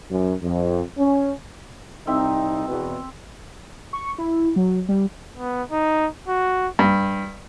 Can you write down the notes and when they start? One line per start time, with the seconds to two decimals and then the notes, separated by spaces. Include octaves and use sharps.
0.10 F#2
0.42 F2
0.98 C#4
2.07 C2 C4 D#4 E5
2.68 E2 B2
3.93 C#6
4.18 E4
4.56 F#3
4.88 G3
5.37 B3
5.71 D#4
6.28 F#4
6.79 G2